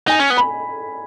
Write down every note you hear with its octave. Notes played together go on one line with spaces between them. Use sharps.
D#4 G#5
C#4
B3
B5